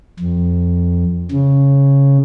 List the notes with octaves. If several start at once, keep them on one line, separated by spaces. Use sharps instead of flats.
F2
C#3